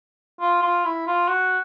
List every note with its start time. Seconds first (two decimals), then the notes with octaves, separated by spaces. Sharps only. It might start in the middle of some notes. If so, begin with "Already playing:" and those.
0.41 F4
0.63 F4
0.85 E4
1.07 F4
1.28 F#4